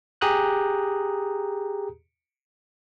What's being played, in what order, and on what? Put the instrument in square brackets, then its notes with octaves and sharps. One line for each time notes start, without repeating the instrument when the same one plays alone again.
[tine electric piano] G4 G#4 A#5 D#6 F#6 G6